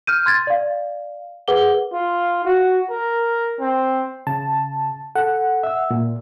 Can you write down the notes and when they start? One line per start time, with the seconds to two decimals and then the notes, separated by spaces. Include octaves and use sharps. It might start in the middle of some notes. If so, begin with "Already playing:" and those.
0.07 F6 G6 D#7
0.26 C6 G#6 A6
0.47 D5 F5
1.48 G#4 A#4 B4 F#5 D6 G7
1.92 F4
2.45 F#4
2.90 A#4
3.60 C4
4.27 C#3 A5
5.16 A4 F#5
5.63 E5 E6
5.91 A#2